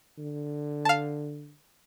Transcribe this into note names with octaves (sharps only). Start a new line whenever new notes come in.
D3
F5 A5